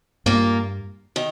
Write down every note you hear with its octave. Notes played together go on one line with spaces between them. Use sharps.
G2 A#2 A#3 F4 A#4
D#3